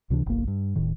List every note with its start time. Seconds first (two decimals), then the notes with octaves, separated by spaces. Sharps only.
0.10 C#2 C3 E3 D4
0.26 F#1 B1 A#3
0.47 G2
0.76 D1 A2 D#3